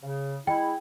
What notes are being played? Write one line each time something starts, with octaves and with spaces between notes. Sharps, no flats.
C#3
G#3 E4 G5